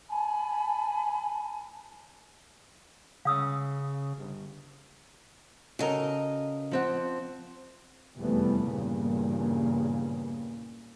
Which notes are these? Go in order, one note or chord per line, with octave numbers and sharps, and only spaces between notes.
G#5 A5 B5
C#3 F5 D#6 E6
G1
C#3 F#4 A4 A#4 D#5
F3 C4 F#5
F1 E2 E3 G3 A3 B3
E2 G2 A#2 C#3 A#3